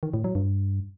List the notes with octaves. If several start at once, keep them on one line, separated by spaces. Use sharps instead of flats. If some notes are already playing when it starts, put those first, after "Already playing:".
D#3
A2
F#3
G2